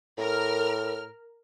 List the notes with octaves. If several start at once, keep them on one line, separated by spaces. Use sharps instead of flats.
A2 A#4 F6